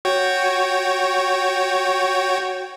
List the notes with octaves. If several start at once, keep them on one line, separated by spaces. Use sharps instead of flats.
F#4 C#5 G5